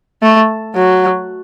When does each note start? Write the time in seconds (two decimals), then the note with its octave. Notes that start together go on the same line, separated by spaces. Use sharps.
0.22 A3
0.75 F#3